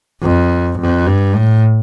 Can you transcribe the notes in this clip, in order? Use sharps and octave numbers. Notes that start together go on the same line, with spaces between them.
F2
F2
G2
A2